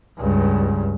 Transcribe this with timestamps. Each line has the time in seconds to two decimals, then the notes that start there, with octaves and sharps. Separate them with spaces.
0.19 C#2 G2